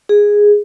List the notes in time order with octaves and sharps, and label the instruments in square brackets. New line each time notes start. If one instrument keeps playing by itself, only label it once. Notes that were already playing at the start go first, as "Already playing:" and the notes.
[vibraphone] G#4